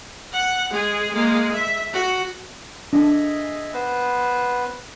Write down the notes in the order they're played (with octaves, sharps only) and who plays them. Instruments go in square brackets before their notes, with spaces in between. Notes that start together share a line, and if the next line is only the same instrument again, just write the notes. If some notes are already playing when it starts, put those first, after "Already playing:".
[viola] F#5
G#3 G#4
G#3 A#3
E5
F#4
[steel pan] D4 [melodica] G#4 D#5 E5
[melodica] B3 B4 C5